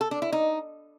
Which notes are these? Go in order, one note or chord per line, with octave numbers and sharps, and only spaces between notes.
A4
D4
E4
D#4